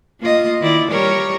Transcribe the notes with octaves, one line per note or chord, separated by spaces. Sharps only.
A#3 F4 D#5
D#3 E4 D5
G3 A#4 C#5